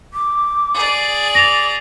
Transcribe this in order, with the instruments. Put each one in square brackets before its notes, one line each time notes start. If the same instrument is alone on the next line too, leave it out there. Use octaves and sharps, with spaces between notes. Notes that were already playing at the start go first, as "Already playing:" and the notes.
[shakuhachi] D6
[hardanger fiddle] G#4 D5
[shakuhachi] D6 [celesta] A#6 F7